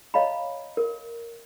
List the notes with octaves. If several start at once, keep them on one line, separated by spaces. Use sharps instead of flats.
C#5 D#5 F5 A#5 B5
A#4